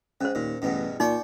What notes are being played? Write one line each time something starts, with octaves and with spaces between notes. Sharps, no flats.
G#2 C#4 C5
D#2 A#2
A1 E2 G2 B2
A#2 D#4 D5 G5 C#6